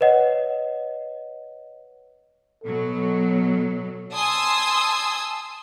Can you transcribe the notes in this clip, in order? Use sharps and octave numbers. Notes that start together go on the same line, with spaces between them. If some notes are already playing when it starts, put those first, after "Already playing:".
B4 C#5 D#5 F#5
B2 F#3 A4
G#5 A5 C6 D#6 E6